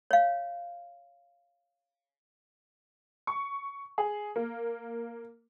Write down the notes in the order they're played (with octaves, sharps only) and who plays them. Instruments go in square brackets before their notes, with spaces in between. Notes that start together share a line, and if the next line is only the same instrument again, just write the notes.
[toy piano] C#5 F5
[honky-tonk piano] C#6
G#4
A#3